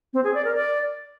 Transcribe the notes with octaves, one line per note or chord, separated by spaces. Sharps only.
C4
G#4
D5
A#4
D5